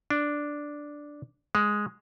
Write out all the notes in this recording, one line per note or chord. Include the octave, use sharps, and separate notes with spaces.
D4
G#3